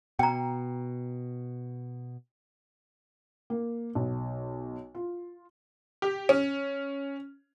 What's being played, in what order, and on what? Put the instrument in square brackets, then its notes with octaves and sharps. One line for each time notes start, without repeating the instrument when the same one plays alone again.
[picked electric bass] B2 [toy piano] G5 A#5
[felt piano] A#3
B1
F4
[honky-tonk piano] G4
C#4